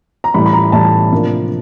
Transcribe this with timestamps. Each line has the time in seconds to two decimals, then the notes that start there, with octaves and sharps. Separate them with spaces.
0.24 A#5
0.34 A2 E3 G3 B5
0.46 B5
0.53 A#5
0.72 A2 E3 G3 A5
1.12 C3 F3 A#3 D4